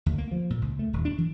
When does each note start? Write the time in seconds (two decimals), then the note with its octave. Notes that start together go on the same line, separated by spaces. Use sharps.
0.06 D2
0.18 A#3
0.31 F3
0.50 A#2
0.62 C#2
0.79 A3
0.93 D#1
1.05 D4
1.18 E3